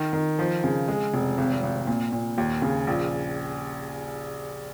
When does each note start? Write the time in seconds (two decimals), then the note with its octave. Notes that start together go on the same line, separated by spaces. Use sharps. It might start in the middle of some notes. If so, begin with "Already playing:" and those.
Already playing: D#3
0.13 D#3
0.39 F3
0.64 C#3
0.88 G#3
1.14 F1
1.38 G#1
1.63 G#1
1.87 A#2
2.12 A#2
2.38 D#2
2.62 C#3
2.87 A#1